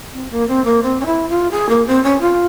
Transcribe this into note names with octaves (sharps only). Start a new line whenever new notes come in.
C4
A#3
C4
A#3
C4
C#4
E4
F4
G#4
A#3
C4
C#4
F4